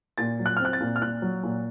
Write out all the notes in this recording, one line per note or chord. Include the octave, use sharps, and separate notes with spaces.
A#2 A6
F#3
F#6
C4 F6
F#6
A6
A#2
F6
A#2 F#6
F#3
A#2